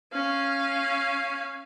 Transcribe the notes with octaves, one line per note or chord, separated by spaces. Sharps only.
C#4 F5